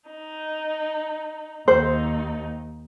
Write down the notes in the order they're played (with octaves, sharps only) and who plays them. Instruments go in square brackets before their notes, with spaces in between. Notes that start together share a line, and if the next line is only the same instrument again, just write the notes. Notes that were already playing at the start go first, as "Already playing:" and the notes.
[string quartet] D#4
[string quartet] D#2 D#4 [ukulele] C5